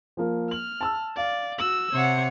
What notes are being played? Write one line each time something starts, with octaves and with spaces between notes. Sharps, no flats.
F3 A#3
F6 F#7
A5 E6
D5 F5
F#4 E6 F#7
C3 C#5 F#5